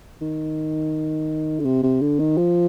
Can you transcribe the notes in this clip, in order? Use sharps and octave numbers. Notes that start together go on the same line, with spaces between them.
D#3
D3
C3
C3
D3
D#3
F3